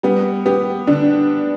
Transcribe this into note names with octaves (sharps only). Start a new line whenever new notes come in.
G3 B3
B3 G4
D3 D4